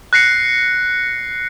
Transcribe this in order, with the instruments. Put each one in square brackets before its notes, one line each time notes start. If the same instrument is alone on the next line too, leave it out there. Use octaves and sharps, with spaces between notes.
[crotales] F#6 A#6 C7 C#7